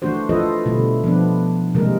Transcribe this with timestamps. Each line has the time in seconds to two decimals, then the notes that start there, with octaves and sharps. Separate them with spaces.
0.02 E3 A3 D4 F#4 C5
0.29 E3 F4 A4 B4 C5 D#5
0.66 B2 D3 G3 A3 E4
1.04 F3 B3 D4 B4
1.75 C3 E3 G3 G#3 A#3 A#4